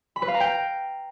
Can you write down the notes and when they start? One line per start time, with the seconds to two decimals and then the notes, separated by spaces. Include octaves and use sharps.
0.16 B5
0.22 B4
0.28 F5
0.34 A#5
0.40 G5